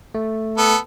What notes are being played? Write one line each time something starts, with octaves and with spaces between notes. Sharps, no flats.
A3
B3 A4